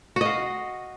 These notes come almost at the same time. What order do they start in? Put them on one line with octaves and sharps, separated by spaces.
F#4 D#5 F5